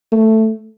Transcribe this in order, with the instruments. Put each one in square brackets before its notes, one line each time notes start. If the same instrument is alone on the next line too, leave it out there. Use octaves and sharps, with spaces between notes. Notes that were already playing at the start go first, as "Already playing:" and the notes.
[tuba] A3